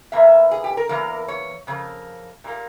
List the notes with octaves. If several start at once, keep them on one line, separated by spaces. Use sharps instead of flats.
E2 E3 A#3 E5
G#4
G4
A#4
E2 E3 A#3 A#4
C#5
F2 C#3 A#3
A#2 G3 A#3